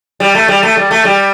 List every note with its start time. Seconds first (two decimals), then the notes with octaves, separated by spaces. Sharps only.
0.20 G3
0.35 A3
0.48 G3
0.63 A3
0.77 G3
0.91 A3
1.05 G3